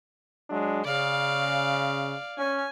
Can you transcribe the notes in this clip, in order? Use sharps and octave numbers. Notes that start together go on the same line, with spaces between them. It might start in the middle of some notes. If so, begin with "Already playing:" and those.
F#3 G#3 D4
C#3 D5 F5
C#4 G#5